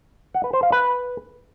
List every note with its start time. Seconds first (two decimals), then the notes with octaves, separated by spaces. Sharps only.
0.34 F#5
0.44 B4
0.53 C5
0.63 F5
0.72 B4